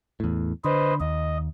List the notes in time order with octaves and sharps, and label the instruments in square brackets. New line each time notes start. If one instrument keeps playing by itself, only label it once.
[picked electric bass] E2 A2
[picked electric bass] D3 [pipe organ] B4 C5 D#5
[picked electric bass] D#2 [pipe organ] D#5